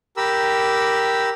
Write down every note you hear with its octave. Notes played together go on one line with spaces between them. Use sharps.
G4 A#4 B5 E6